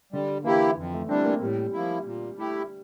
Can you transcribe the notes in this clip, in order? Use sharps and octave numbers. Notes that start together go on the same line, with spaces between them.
D3 G3
E3 A#3 E4 G4
F2
A3
E3 G3 C4 D4
A#3
A2 G3
F3 A#3 E4
A#2
A3 E4 G4